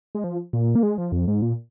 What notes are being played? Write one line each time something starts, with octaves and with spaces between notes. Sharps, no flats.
G#3
F3
A#2
A#3
G#3
F3
F2
G#2
A#2